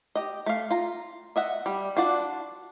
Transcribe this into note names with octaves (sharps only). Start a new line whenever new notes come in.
G4 D#5
A3 F5
F4 A#5
D#5 E5 F#5
G3
D4 F4 F#4 D5 F#5